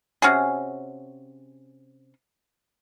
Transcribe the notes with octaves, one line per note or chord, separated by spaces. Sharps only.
C3 C#4 F#4 G#4